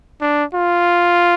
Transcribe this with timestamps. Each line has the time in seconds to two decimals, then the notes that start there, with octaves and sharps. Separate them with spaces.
0.21 D4
0.54 F4